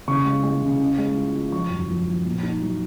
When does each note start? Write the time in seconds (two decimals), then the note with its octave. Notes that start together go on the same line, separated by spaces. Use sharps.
0.08 C#3 C#6
0.26 G#3
0.43 G#3
0.62 C#3
0.79 C#4
0.98 G#3
1.17 F4
1.35 F4
1.52 F3 C#6
1.70 F#2
1.88 F3
2.07 F3
2.25 A#2
2.43 D#4
2.61 F#3